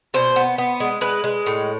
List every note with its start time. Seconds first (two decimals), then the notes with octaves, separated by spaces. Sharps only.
0.14 B2 C5
0.36 B3
0.58 B3
0.80 G#3
1.01 G#3 B4
1.24 G#3
1.46 A2